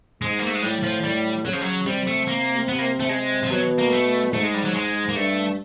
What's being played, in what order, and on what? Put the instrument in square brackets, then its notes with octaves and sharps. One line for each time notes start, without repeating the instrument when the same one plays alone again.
[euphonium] G#2 [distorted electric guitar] G#3
[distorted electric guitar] A#3
A3
G#3
[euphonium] A2 [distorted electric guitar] G3
[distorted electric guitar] F3
[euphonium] A2 [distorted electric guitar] G3
[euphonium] C#3 [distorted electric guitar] F#3
[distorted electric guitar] F3
F#3
[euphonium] C3 [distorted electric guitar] G3
[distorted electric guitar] A3
A#3
B3
A#3
A3
[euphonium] C3 [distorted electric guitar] G#3
[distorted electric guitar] F3
[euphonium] B2 [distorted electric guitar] F#3
[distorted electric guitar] A#3
A3
[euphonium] G#2 [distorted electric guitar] A3
[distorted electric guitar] G#3
G3
F#3
G#3
A#3
[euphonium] G2 [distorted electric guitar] A3